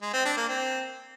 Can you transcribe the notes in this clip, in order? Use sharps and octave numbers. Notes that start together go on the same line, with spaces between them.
G#3
C4
D4
A#3
C4